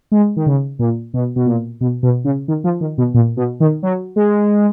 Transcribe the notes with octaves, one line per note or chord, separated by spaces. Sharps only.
G#3
D#3
C#3
A#2
B2
B2
A#2
B2
B2
C#3
D#3
F3
D#3
B2
A#2
B2
D#3
F#3
G#3